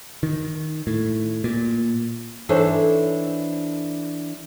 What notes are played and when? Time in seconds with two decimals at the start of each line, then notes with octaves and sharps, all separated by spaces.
0.23 D#3
0.87 A2
1.44 A#2
2.49 E3 D4 D#4 A4 C5 C#5